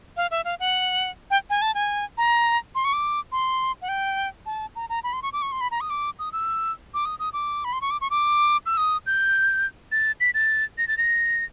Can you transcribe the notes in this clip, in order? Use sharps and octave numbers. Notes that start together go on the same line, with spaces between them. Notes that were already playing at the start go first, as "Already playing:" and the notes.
F5
E5
F5
F#5
G5
G#5
A5
G#5
A#5
C6
C#6
D6
C6
F#5
G5
A5
A#5
A#5
B5
C6
C#6
D6
C#6
C6
B5
A#5
D#6
D6
D#6
E6
D6
D#6
D#6
D6
B5
C6
C#6
D6
C#6
D6
E6
D#6
G6
A6
B6
A6
A#6
A6
A#6